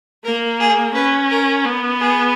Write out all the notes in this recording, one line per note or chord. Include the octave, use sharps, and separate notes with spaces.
A#3 A#4
G#4
C#4 B4
A#4
B3
G#4